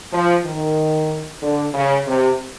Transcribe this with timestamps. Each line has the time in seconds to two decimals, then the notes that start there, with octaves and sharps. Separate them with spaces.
0.13 F3
0.45 D#3
1.42 D3
1.74 C#3
2.06 C3